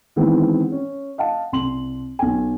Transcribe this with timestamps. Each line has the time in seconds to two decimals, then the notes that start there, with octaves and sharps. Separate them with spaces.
0.16 D#3 E3 G#3 B3 C4
0.72 C#4
1.18 D#5 F5 F#5 A5
1.52 C2 C6 F#7
2.19 B1 G#5